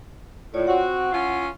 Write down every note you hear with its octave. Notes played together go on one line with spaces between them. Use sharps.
A2 F4 C#5 D5
C4 F#4 F#5
C#4 E4 F4